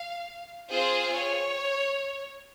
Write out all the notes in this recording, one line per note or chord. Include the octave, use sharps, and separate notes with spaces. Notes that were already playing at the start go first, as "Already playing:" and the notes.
Already playing: F5
C4 F4 G#4 C5
C#5